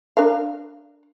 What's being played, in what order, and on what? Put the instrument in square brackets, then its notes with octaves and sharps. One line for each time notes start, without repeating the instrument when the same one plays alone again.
[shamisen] D4 A#4 F5